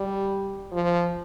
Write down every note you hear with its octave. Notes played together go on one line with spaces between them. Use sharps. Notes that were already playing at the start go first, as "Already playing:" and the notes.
Already playing: G3
F3